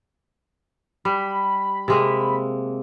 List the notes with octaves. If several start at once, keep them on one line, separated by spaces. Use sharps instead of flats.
G3 B5
C3 G#3 A#3